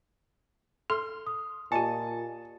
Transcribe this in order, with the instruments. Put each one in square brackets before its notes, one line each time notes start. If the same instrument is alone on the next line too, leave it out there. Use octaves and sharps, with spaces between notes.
[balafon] A4 [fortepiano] C6 [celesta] F6
[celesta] D#6
[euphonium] A#2 [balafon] F4 G4 [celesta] D#5 G#5 [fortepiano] A5